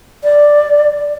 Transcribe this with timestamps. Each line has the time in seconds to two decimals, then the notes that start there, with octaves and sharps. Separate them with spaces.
0.24 D5